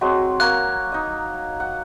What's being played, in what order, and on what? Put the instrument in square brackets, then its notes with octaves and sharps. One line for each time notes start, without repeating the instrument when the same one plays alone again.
[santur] F#3 G#3 C4
[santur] A#3 C#5 A#5 [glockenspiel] F#6
[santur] D#4 D#5
F#5